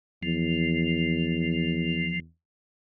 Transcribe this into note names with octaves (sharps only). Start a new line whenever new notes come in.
E2 F3